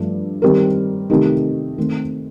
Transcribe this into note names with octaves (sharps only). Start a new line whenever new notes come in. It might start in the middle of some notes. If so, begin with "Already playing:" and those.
Already playing: G2 F3 A3
D#3 G3 C4 G4 A#4
C3 D#3 A3 D#4 G4
D#3 A3 C4